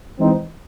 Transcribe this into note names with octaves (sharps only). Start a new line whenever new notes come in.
E3 G#3 C4 D#4